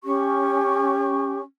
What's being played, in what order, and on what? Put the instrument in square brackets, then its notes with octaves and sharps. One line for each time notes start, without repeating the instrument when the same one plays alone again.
[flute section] C#4 C#6 [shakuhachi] G4